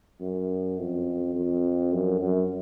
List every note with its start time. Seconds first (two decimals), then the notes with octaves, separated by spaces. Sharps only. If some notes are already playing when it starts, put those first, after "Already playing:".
0.21 F#2
0.78 F2
1.35 F2
1.92 F#2
2.21 F#2